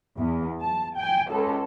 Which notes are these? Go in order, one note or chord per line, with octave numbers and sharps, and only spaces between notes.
E2
A5
G5 G#5
C#2 A4